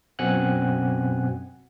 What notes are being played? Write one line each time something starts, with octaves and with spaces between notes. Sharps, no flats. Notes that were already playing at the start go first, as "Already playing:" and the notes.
F#2 B2 C4 F#5 G#5 F#6